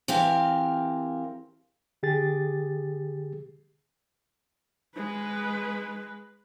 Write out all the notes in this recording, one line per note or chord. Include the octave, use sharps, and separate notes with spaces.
E3 C4 G4 A#4 F5
D3 G4 G#4 A6
G#3 B4